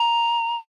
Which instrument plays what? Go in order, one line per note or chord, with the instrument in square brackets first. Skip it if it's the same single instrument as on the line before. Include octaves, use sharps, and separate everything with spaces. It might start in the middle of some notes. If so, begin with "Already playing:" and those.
Already playing: [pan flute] A#5